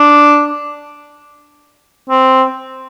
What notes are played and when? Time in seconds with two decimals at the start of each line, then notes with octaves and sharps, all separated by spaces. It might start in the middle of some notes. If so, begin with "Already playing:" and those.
Already playing: D4
2.10 C4